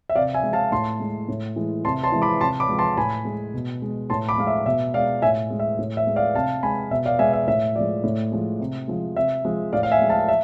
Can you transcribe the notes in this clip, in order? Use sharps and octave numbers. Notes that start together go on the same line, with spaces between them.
E5
C3 D5 F5
E5 G#5
G#3
F5 A5
A2 A5 C6
G#3
A2
E3 G#3
C3 A5 C6
A5 C6
E3 G#3
B5 D6
C3 A5 C6
B5 D6
F3 G#3
A5 C6
A2 G#5 B5
G#3
B2
G#3
A2 A5 C6
B5 D6
G#3 F5
E5
B2 E5
G#3 D5 F5
A2 E5 G#5
G#3
E5
A2
E5
G#3
D5 F5
C3 F5 A5
G#3 G#5 B5
B2 E5
D5 F5
G#3 E5 G#5
E5
A2 E5
F3 G#3 D5
A2
F3 G#3
C3
F3 G#3
C3 E5
F3 G#3
A2 D5 F5
F5
E5 G#5
G#3
F5 A5
E5